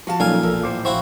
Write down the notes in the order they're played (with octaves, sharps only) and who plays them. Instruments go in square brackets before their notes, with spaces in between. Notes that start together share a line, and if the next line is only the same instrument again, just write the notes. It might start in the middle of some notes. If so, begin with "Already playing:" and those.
[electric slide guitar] F3 [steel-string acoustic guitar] F#4 F5 A5
[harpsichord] A#2 F5 G#5 [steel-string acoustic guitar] F#3 [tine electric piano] C#4 D#4 A4
[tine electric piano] B1 A4 A#4 [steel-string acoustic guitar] E2
[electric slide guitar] A2 C5 [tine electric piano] D6
[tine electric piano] A#1 F5 C#6 [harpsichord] C4 E4 F#4